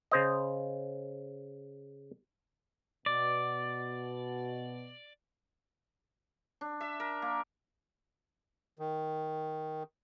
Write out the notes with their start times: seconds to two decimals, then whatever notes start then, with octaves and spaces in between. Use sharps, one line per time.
0.11 C#3 C5 D#5
3.06 B2 D5
6.61 D4
6.81 E5
7.00 A#4
7.22 A#3
8.79 D#3